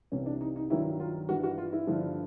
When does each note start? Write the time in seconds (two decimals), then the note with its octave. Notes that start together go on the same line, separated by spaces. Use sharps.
0.12 C2 C3 E3 C#4
0.26 D4
0.41 D#4
0.56 D#4
0.70 G2 D#3 F#3 E4
1.00 F4
1.29 G2 E3 F#4
1.43 F#4
1.58 F4
1.73 E4
1.87 G2 D3 F3